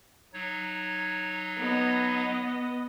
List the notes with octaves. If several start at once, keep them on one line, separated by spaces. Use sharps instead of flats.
F#3 D#4 C#5
B3 D#5